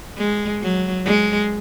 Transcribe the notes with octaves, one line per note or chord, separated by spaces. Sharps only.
G#3
F#3
G#3